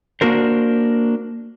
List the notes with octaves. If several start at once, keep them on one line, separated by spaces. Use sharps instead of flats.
A#3 D4 F#4 A#4 C5